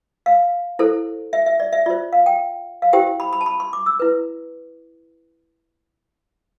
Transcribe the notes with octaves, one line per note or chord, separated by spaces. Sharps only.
F5
E4 A4 C5
E5
E5
D5
E5
F4 C5 D5
F5
G5
F5
E4 G4 C5 G5
B5
B5
A5
B5
C6
D6
E6
E4 B4